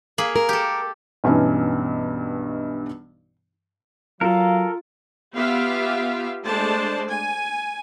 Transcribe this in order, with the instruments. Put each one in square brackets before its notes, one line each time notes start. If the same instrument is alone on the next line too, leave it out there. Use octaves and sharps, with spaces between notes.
[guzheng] A#3 G#4 B5
[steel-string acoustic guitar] A#4
[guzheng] G4 A4
[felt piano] B1 G2 E3 C#4 D#4
[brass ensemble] F#3 [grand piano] F4 [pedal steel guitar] A4 A#4 [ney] F5
[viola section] B3 F4 G4 E5 F5
G#3 A3 D4 C5 D5 A5
G#5